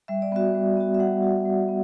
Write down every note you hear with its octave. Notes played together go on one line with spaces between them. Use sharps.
G3 E5
D5
B3 F#4 E5
G3
B3 F#4
E5
G3 F#5
B3 F#4
G3
B3